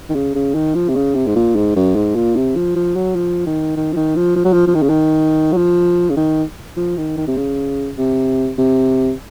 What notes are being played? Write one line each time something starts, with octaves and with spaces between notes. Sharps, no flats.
D#3
C#3
C#3
D#3
F3
C3
C#3
C3
G#2
A#2
G#2
F#2
G#2
A#2
C3
F3
F3
F#3
F3
D#3
D#3
F3
D#3
F3
F3
F#3
F3
F3
D#3
C#3
D#3
F#3
F3
C#3
D#3
F3
D#3
D#3
C3
C#3
C3
C3